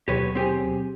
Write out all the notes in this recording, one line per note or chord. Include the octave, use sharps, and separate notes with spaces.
D#2 B2 F#3 G4 B4 C#5
C4 G4 G#4